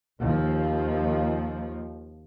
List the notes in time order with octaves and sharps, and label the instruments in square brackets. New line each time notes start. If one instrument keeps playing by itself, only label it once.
[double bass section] D#2 F3